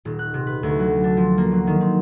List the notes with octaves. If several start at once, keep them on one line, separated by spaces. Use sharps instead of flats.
D#1
F#6
C3
B4
D2
F#3
D4
F3
A#3
F#3
D#3
C4